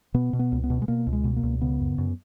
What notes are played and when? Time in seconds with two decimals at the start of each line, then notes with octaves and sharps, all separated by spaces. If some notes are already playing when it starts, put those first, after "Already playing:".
0.14 B2 B3
0.33 B2
0.39 B3
0.52 C#2
0.64 B3
0.70 B2
0.82 G#3
0.88 B2 A#3
1.07 C#2
1.13 G#3
1.24 B2
1.36 A#3
1.43 C#2
1.61 C#3 B3
1.80 F#2
1.98 F#2